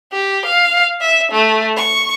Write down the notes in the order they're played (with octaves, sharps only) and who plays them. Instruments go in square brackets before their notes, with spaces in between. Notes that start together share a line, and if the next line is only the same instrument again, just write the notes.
[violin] G4
F5
E5
A3
C#6